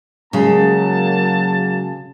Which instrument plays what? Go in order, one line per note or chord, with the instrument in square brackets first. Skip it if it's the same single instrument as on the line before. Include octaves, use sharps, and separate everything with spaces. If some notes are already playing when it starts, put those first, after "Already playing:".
[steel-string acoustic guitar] C#3 G#3 [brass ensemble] F#3 A#3 A5